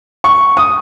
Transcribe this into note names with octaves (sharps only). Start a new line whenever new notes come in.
C#6
D#6